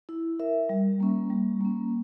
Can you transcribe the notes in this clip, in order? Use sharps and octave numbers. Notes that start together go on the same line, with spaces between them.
E4
A#4 E5
G3
A#3 C#4
G3
A#3 C#4